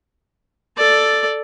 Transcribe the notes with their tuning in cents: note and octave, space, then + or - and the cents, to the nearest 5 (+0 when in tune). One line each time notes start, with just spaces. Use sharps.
A4 +0 D5 +0